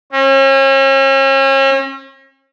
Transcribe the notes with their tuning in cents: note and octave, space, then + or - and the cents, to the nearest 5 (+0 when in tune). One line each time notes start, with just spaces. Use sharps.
C#4 -40